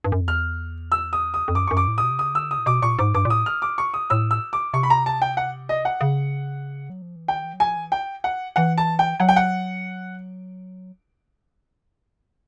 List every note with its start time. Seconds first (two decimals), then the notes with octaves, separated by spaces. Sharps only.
0.04 G2
0.12 F#2
0.21 F2
0.28 E2 F6
0.92 E6
1.13 D#6
1.34 D#6
1.48 F2
1.55 F#2 D6
1.67 F#2 C#6
1.77 D6
1.88 A2
1.98 D#6
2.03 B2
2.11 C3
2.19 C#3 D#6
2.34 D3 E6
2.51 C#3 D#6
2.58 A#2
2.66 B2 D6
2.82 A#2 C#6
2.99 G#2 D6
3.14 G2 D6
3.25 A#2
3.30 A2 D#6
3.46 F6
3.62 D6
3.78 C#6
3.94 D#6
4.10 A2 E6
4.31 E6
4.53 D6
4.74 C3 C#6
4.83 B5
4.90 A#5
5.06 A5
5.22 G5
5.37 F#5
5.69 D#5
5.85 F#5
6.01 C#3
6.90 F#3
7.02 F3
7.16 E3
7.28 D#3 G5
7.44 E3
7.54 F#3
7.60 F3 G#5
7.77 E3
7.92 G5
8.24 F#5
8.56 E3 F#5
8.78 A5
8.99 G5
9.20 F#3 F#5
9.29 G5
9.36 F#5